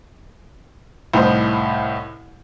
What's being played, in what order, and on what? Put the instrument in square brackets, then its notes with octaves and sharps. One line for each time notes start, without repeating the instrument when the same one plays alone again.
[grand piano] C2 A2 D#4 C5